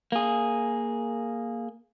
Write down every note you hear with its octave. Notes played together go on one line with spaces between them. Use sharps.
A#3 G#4